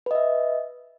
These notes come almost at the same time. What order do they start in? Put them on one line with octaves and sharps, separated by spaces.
B4 D#5 E5